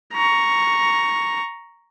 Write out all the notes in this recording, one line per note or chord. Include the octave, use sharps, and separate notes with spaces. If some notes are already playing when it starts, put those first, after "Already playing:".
A#5 C#6